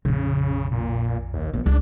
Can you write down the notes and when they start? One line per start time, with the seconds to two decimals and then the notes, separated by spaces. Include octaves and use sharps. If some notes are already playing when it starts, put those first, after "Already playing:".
0.05 A#1 F2 C#3
0.71 A#2
1.34 D#2
1.53 A#1 B3
1.66 C#2 D4